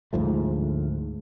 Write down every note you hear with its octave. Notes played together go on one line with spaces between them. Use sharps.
D2 G#2 F3 A3